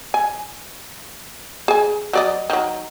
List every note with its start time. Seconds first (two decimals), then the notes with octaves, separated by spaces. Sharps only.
0.14 G#5
1.68 G#4 G#5
2.13 F#3 D5 D#5
2.50 D#3 F#3